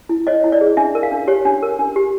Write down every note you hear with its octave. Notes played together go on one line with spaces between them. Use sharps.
E4
C#5 D#5
E4
D5
G#4
D4 E5
A#4
F5
D4
G4 C#5
D4
A#4
D4
G4